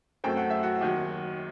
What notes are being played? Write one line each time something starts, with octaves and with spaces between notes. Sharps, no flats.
F#2 F#3 A3 C4 G5
F#5
E5
F#4 F#5
D#2 D#3 F#3